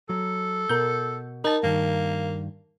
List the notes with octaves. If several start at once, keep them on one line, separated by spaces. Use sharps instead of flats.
F#3 A4
B2 A#4 G6
D#4 A#4 A5
G2 D#3 A#3